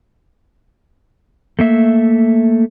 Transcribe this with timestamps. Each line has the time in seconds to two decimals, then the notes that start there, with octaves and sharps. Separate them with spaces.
1.59 A3 A#3 E5